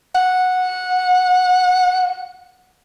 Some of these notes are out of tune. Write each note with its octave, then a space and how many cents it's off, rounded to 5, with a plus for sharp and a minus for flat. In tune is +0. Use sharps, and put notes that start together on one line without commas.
F#5 -10